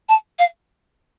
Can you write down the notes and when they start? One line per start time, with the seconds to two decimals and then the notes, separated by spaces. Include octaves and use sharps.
0.08 A5
0.38 F5